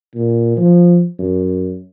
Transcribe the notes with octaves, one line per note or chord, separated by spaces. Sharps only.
A#2
F3
F#2